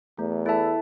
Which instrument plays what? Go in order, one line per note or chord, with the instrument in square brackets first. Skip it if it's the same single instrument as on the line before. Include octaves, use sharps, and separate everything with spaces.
[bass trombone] E2 [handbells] A3
[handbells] E4 A4 E5 A5